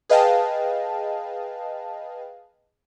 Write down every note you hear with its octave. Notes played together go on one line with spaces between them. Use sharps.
G#4 B4 D#5 F5 G5 A5